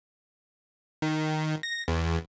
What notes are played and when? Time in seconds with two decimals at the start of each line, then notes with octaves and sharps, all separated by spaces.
1.02 D#3
1.63 A#6
1.88 E2